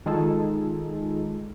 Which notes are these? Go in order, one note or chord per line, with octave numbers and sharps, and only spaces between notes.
D#3 G#3 D#4 F4 G#4 A4